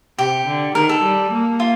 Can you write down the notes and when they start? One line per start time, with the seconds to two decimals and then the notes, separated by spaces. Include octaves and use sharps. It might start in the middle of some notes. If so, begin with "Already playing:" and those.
0.18 C3 G4
0.46 D3
0.74 D#3 A#4
0.89 A4
1.03 G3
1.32 A#3
1.60 F4